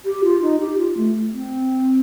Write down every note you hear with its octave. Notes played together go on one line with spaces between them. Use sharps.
G4
F4
D#4
G4
F4
A3
C4